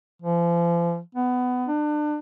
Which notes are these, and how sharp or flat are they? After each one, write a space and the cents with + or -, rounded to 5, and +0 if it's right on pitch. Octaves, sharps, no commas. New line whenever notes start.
F3 -35
B3 +20
D4 +30